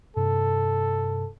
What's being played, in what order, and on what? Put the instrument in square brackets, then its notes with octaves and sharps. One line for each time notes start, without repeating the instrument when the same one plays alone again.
[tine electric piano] G2 C3 [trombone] A4